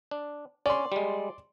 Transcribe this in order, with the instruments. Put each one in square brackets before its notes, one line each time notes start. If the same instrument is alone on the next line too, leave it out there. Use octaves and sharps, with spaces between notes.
[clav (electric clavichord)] D4
[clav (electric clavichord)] C#4 [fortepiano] D5 C6
[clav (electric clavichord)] G3 G#3